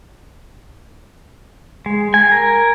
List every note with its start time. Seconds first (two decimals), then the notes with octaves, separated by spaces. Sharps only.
1.86 G#3
2.14 G#5
2.32 A#4